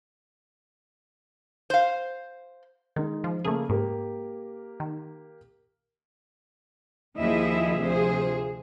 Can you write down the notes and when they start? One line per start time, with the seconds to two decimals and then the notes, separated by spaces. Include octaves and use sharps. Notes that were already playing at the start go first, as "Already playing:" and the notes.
1.70 C5 F5
2.96 D#3 G#3 D#4
3.24 F3
3.45 C#3 A3 A#3 G#4 A4
3.69 G#2 A#3 G4 A#4
4.80 D#3
7.18 D#2 F3 E4 G#4 D#5 E5
7.80 D2 C3 F3 G#4 C5